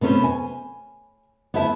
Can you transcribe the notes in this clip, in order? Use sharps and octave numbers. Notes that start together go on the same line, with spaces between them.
C3 B3 C#4 B4 C5
G#5
B3 E4 C5 E5 A5